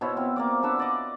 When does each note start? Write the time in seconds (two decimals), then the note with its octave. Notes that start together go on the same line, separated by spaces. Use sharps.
0.01 B2 E4 C5 C#5
0.17 C4 F4
0.36 A#3 D5 D6
0.63 D4 B4 E5 F#5
0.79 D5 D#5